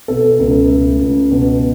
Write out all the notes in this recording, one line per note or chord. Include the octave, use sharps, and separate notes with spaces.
B2 A4
C#2
A3
C#2
B2